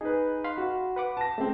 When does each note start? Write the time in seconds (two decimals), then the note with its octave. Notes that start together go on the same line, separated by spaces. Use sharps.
0.01 D#4 G#4 B4
0.44 F5 B5 C6
0.57 F#4
0.96 B4 F#5 D6
1.17 A5 A#6
1.38 G#3 A3 C4